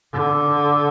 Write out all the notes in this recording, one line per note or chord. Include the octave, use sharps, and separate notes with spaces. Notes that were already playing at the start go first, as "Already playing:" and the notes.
D3